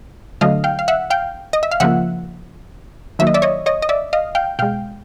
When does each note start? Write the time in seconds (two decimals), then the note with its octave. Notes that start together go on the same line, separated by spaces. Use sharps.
0.41 D3 F#3 A3 D#5 F5
0.64 F5 G5
0.79 F5
0.88 E5 F#5
1.10 F5 G5
1.53 D#5
1.63 E5
1.71 F5
1.80 C#3 F3 A#3 E5 F#5
3.19 D#3 F#3 A#3 E5
3.27 D#5
3.34 D5 E5
3.42 C#5 D#5
3.66 C#5 D#5
3.82 D#5
3.89 D5 E5
4.13 D#5 F5
4.35 F5 G5
4.59 B2 G#3 F5 G5